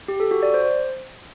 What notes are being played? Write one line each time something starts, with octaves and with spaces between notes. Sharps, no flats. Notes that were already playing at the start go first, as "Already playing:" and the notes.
G4
A4
F#4
D5
C5